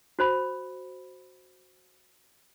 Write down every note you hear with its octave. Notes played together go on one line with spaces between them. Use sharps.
F#4 C5 B5